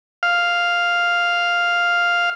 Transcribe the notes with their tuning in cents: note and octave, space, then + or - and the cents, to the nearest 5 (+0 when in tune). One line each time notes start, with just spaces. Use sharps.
F5 +0